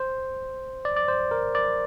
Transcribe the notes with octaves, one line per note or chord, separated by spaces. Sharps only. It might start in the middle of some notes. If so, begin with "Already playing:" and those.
Already playing: C5
D5
D5
C5
A#4
D5